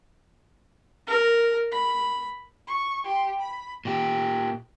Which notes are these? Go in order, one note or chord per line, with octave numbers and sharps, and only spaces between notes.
A#4
B5
C#6
G4 C6
B5
A#2 G4